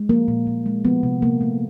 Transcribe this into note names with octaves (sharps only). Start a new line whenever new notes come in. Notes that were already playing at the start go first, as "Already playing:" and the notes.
Already playing: G#3
F3 A#3
A#2
A#2
G#3
F3 B3
C3
C3 A#3
A3